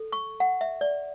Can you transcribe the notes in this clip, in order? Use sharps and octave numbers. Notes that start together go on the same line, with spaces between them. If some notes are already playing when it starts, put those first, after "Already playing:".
Already playing: A4
C#6
F#5
E5
D5